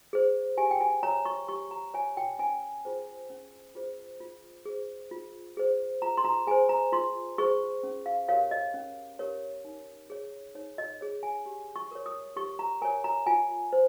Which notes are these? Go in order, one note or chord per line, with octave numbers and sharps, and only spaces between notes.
G#4 C5
G4 G#5
G5
G#5
C#5 A#5
C#6
G4 C#6
A#5
C#5 G#5
G5
C#4 G#5
F4 G#4 C5
C#4
F4 G#4 C5
F4
G#4 C5
F4
G#4 C5
F4 A#5
C6
A#5
G#4 C5 G#5
A#5
F4 C6
G#4 C5 C#6
C#4
F5
G4 A#4 C#5 F5
D#5
C#4
G4 A#4 C#5
D#4
G#4 C#5
D#4 C#5
D#5
G#4 C#5
G#5
G4
C#6
A#4 C#5
D#6
G4 C#6
A#5
A#4 C#5 G#5
A#5
F4 G#5
C5